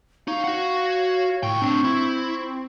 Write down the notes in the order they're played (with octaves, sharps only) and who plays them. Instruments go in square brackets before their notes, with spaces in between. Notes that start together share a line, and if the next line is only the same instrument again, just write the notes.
[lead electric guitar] D#4 [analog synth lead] C#5 [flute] F5
[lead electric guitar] F#4 F#5
[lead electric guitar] C#2 G5 [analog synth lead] A2 [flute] C#6
[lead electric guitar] A2 D4 [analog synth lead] C4
[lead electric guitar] E4
[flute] C#6